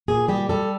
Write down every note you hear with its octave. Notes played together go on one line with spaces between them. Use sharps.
A#2 G#4
G3 G4
G3 A4